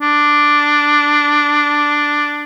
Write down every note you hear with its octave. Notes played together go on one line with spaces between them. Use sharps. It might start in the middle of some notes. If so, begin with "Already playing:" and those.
D4